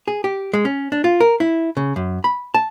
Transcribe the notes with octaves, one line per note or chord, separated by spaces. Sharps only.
G#4
G4
G#3
C#4
D4
F4
A#4
E4
C#3
F#2
B5
A5